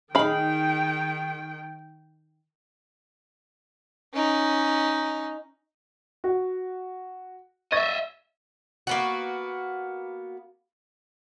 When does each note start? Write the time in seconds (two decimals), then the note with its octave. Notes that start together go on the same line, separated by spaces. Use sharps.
0.15 D#3 D#4 G#4 F5 G5 B5
4.14 C#4 D#4
6.24 F#4
7.72 D#5 E5 C#6 G#6 A6
8.87 A#3 B3 F#4